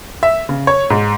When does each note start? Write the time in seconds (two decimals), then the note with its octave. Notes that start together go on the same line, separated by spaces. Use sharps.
0.23 E5
0.49 C#3
0.67 C#5
0.90 G#2